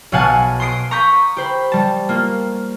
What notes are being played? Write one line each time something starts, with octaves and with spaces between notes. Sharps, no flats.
B1 B2 F5 F#5 G#5 A5
C6 D#6 C7 D7
A#5 C#6 D#6 G6 A#6 B6
G4 C5 B5
G3 A5
A#3 F4